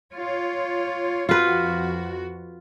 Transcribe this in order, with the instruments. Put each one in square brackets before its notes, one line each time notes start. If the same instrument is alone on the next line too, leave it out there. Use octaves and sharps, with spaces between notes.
[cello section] F4 C#5
[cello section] F2 F#4 [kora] F4 B4